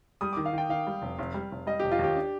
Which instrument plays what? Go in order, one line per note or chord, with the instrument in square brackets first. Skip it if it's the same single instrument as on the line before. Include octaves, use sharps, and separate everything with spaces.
[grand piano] G3 [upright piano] D#6
[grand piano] D#3 [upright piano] D6
[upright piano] F5
[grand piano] D#3 [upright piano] G5
[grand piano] D#3 [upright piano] F5
[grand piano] G3
F1
F1
G3
F1
[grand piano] G3 [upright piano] D#5
[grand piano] F1 [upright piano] G4
[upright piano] F4
[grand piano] D#2 [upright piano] G4
[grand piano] D4